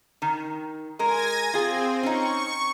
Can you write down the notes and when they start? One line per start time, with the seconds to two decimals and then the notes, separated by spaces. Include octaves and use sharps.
0.22 D#3
0.99 G#3 A#4 G#5 G#6 A#6
1.54 C4 F4 G#4
2.03 C#4 D#4 C#6